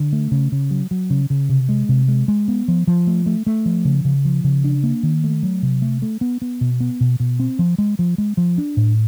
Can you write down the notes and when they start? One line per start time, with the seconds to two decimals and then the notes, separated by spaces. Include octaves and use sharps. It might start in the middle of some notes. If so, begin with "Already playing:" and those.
Already playing: D3
0.12 A3
0.31 C#3
0.52 C#3
0.71 F#3
0.91 F#3
1.10 C#3
1.30 C#3
1.49 C3
1.69 G#3
1.89 C3
2.08 G#3
2.28 G#3
2.48 B3
2.68 F3
2.87 F3
3.07 A3
3.26 A3
3.46 A3
3.66 F3
3.85 C#3
4.05 C#3
4.25 F3
4.44 C#3
4.64 D4
4.83 A#3
5.03 D#3
5.24 A3
5.43 F#3
5.63 C3
5.82 A3
6.02 A3
6.21 B3
6.42 B3
6.61 B2
6.80 B3
7.01 B2
7.20 B2
7.40 C4
7.59 F3
7.78 G#3
7.99 F3
8.18 G#3
8.37 F3
8.58 D4
8.77 A2